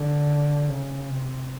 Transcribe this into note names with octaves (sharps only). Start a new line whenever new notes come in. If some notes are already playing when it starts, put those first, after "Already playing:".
Already playing: D3
C#3
C3